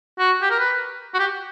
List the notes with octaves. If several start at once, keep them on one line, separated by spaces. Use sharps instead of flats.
F#4
G4
A#4
B4
F#4
G4